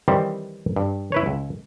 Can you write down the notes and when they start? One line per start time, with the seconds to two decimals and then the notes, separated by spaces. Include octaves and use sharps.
0.08 D#3 E3 G3 C4
0.76 G2
1.12 E4 B4 C#5
1.26 C#2